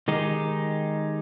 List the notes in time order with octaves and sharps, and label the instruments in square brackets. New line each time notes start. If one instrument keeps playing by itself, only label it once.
[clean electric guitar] D#3 G#3 D#4 G4